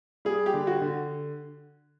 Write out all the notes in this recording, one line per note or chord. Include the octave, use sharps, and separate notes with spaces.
G3 G#4
G4
D3
F#4
D3